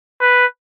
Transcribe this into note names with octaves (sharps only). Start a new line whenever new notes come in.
B4